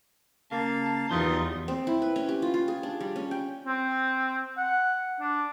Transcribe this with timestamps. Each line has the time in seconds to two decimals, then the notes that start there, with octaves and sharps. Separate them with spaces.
0.51 C#3 A#3 F5 A5
1.11 E2 F#3 G3 D#4 F4 C5 D#6
1.68 C4
1.87 E4
2.02 B4
2.16 C#4
2.29 G4
2.42 F4
2.54 F4
2.68 G#4
2.83 D4
3.00 G3
3.16 C#4
3.31 G5
3.67 C4
4.58 F#5
5.21 D4